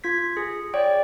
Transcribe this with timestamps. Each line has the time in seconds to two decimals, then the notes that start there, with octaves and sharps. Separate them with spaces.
0.04 F4 G#6 B6
0.37 G#4
0.74 C#5 D5 G5